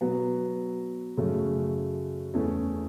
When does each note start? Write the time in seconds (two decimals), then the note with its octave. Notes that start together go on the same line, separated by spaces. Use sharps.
0.01 B2 F#3 B3
1.17 F#2 C#3 A3
2.34 E2 E3 A3 C#4